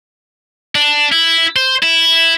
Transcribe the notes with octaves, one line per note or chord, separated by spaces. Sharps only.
D4
E4
C5
E4